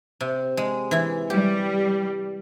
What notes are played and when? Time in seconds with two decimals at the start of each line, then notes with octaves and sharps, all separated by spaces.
0.21 C3
0.57 G#3
0.91 E3 E4
1.30 G3 G4